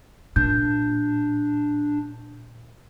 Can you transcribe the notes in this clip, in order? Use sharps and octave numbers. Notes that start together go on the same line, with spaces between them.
A#2 D4 G6